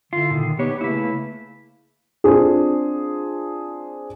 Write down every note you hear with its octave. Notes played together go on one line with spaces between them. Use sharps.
D3 E4 F4
A#2 D#3
B3 D#4 G4 C#5
C#3 A3 A#3 E4 B4
C4 D4 F4 G#4